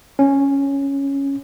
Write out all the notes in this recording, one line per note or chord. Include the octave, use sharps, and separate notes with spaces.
C#4